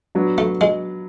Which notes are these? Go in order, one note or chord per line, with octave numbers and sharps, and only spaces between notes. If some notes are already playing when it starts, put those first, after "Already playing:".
F#3 B3 D4
A3
G#3